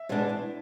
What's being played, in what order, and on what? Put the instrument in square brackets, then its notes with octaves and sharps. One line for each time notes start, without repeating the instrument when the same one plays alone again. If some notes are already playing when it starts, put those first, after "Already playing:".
Already playing: [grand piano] E5
[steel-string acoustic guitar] B2 G#3 B3 D4
E2